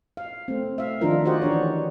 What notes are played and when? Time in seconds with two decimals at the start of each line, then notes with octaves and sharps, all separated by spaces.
0.17 F5
0.48 A3 C4
0.78 E5 F5
1.01 D#3 F3 D4 D#4 F4 A#4
1.25 F#4 G4 C5 D5 D#5 F#5
1.42 E3 D4 C#5